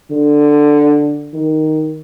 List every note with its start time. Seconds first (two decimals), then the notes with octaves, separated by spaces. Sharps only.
0.11 D3
1.34 D#3